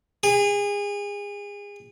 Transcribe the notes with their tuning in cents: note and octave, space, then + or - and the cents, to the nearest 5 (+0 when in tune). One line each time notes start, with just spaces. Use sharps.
G#4 -30